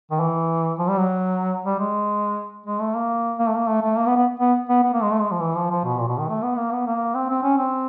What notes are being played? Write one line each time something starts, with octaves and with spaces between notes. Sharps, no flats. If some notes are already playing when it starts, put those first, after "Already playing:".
D#3
E3
F3
G3
F#3
G3
G#3
G#3
A3
A#3
A#3
A3
A#3
A3
A3
A#3
B3
B3
B3
B3
B3
A#3
G#3
A3
G#3
F3
E3
F3
F3
B2
A#2
B2
D#3
A3
B3
A#3
B3
A#3
C4
C4
C#4
C4